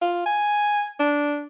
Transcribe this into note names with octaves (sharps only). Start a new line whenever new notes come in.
F4
G#5
D4